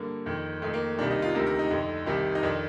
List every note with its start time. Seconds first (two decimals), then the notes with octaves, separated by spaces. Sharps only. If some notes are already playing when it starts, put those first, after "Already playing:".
Already playing: G2 D3 A#3
0.26 F2 D#3
0.62 F2 D#3 A3
0.74 A#3
0.98 C2 C3 D#3 D4
1.10 D#4
1.22 F4
1.35 D2 C3 D#3 A#4
1.46 A#4
1.59 D#4
1.71 F2 D3
2.06 C2 C3 D#3
2.35 D#4
2.43 F2 D#3 D4